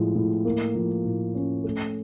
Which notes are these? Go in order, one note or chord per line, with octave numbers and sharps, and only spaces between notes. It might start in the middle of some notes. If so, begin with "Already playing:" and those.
Already playing: A2 F3 G#3
A2
A#3
F3
A2
C#4
A3